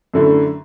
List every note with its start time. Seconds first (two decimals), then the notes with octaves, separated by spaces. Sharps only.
0.14 F#2 D3 A3 E4